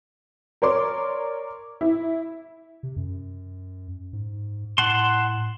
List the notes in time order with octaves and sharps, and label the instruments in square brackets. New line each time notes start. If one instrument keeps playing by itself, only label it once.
[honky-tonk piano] A#4 C#5 D5 C6 D6
E4
[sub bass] C3
F#2
G#2
[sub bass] A2 [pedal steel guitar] F#5 A5 C6